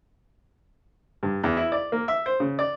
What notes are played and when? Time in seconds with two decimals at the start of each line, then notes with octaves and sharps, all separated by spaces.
1.23 G2
1.44 E2
1.57 E4
1.72 D5
1.92 A#3
2.08 E5
2.26 C5
2.40 C#3
2.59 D5